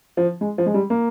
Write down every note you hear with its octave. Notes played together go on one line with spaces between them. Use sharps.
F3
G#3
F3
G#3
G3
A#3